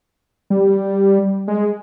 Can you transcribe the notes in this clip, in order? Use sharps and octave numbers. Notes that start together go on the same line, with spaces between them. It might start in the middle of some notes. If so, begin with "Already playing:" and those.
G3
G#3